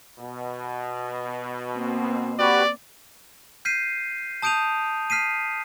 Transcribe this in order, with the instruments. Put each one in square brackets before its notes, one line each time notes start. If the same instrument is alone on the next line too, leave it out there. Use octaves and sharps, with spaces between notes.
[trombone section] B2
[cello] A#3 C4
[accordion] F#4 G4 B4 [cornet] D5
[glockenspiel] F6 G6 B6 C7 D#7
A5 D#6 G6 D7 D#7 F7
F6 B6 C7 D#7